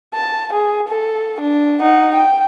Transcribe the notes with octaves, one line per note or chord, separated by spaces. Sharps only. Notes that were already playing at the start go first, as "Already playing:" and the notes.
A5
G#4
A4
D4
D#4 F#5
G5